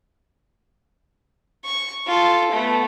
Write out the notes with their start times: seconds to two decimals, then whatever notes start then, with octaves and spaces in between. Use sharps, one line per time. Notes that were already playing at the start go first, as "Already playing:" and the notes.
1.65 C#6
2.07 F4 A4
2.52 A3 B3